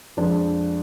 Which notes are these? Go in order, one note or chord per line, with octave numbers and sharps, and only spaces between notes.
F2 F3 G#3 D4